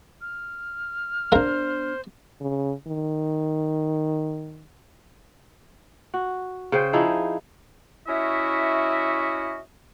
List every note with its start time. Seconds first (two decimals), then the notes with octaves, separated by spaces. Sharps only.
0.21 F6
1.32 B3 D4 A#4 C5 F5
2.40 C#3
2.87 D#3
6.14 F#4
6.72 C#3 C5 G5
6.93 F3 D#4 E4 G#4
8.07 C#4 E4 F#4 D#5 E5